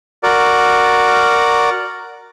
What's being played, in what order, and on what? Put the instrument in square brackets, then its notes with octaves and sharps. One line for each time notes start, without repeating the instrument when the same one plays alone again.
[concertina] F#4 A#4 D5